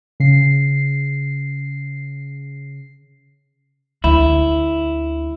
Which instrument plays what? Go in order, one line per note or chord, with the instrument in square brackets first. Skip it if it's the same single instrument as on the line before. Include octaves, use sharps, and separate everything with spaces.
[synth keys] C#3 C7
[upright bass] D2 [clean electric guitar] E4